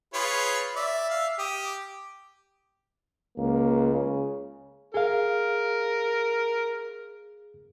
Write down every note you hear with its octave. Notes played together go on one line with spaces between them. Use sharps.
F4 G#4 B4 C#5
D5 E5
F5
G4 D#6
D6
C#2 A#3
C#3
G#4 A#4 F5